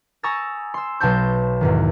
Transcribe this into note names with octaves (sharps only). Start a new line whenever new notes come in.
G#5 A#5 C#6 D#6 E6 A6
C6 E6
B1 B2 A5 C6 G6
E2 G#2 D#3